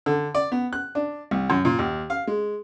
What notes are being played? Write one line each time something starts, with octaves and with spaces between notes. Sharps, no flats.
D3
D5
B3
F#6
D4
C2
F#2
A#2
D#2
F5
G#3